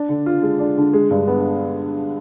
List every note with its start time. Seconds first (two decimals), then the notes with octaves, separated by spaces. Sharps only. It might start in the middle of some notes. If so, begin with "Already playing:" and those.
Already playing: D4
0.09 D3
0.26 F4
0.42 G#3
0.59 D4
0.77 D3
0.93 G#3
1.10 G2
1.27 B3